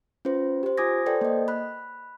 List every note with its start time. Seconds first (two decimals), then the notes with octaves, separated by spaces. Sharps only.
0.25 C#4 F4 B4 C5
0.63 G4 C5
0.78 F4 G#5 D6 D#6 G#6 A#6
1.06 A4 B4 C5 D5 G5
1.21 A#3 D#5
1.48 B5 F#6